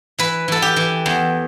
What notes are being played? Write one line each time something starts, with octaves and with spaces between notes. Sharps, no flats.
E3 B4
E3 A4
G4
E3
E2